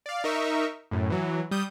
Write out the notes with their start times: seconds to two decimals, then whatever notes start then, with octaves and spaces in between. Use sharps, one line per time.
0.06 D5 F5
0.24 D#4 A#4 E5 C#6
0.91 F#2 A2
1.10 E3 F#3
1.51 G3 D#6 G6